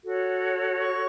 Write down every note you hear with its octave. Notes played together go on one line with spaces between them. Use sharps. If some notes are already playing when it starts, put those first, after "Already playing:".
F#4 A4 C#5
C#6